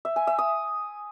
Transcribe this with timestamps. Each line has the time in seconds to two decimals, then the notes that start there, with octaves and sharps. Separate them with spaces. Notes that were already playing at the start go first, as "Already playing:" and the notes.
0.05 E5
0.16 G#5
0.27 E5
0.39 D#6